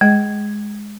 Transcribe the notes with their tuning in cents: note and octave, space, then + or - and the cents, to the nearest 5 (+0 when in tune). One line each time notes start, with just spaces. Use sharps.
G#3 +0 G#4 +0 D#5 +0